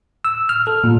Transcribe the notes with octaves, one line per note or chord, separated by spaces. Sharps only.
E6
F6
A4
A#2